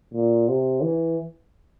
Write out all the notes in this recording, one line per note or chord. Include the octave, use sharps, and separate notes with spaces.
A#2
C3
E3